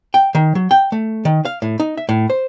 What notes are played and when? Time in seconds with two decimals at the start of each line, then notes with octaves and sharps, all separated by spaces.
0.14 G5
0.35 D#3
0.55 F#3
0.71 G5
0.92 A3
1.25 D#3
1.45 F5
1.62 A2
1.80 D#4
1.97 E5
2.09 A2
2.30 C5